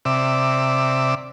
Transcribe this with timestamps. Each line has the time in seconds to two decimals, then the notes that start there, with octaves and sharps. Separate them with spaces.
0.05 C3 D5 E5